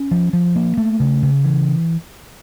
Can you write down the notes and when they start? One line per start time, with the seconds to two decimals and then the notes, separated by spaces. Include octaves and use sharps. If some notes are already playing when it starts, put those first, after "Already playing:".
Already playing: C#4
0.11 F3
0.33 F3
0.56 A#3
0.78 A3
1.00 C#3
1.22 C#3
1.44 E3